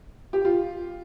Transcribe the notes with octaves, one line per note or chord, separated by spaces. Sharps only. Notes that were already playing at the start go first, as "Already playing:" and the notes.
G4
F4